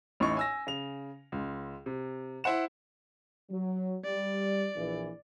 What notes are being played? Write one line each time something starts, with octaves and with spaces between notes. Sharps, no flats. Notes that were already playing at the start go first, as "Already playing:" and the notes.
A1 A2 D#4 C#6
G#5 E6 A#6
C#3 F7
C#2
C3
E4 C5 F#5 E7
F#3
G3 D5
A#1 E3